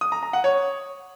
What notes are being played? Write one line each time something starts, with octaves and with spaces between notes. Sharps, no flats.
D#6
A#5
A#5
F#5
C#5